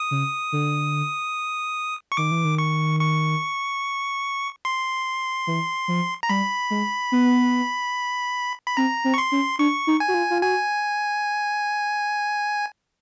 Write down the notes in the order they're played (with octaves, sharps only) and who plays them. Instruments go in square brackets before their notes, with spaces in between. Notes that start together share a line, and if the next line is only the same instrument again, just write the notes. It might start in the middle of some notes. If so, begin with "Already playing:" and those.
Already playing: [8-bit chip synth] D#6
[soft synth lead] C#3
D3
[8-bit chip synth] C#6
[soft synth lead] D#3 [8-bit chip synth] D6
[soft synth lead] E3
D#3
[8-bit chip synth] C#6
C#6
C6
[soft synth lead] E3
F3
[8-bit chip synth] A#5
[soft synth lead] G3 [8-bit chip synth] B5
[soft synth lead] G#3
B3
[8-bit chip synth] B5
[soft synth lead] C4 [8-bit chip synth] A#5
[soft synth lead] C4
[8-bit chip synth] C#6
C6
[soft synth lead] C#4
[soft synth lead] D4 [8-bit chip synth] C#6
[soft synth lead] D#4
[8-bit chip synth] G#5
[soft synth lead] F#4
F4
F4
[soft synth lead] F#4 [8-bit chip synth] G#5